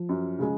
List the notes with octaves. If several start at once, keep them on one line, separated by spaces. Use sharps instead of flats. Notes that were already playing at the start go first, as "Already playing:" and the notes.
Already playing: F3
F#2
C#3 G#3